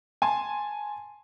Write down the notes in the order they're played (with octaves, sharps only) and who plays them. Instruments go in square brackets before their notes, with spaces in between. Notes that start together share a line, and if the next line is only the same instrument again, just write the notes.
[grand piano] G#5 A5 C6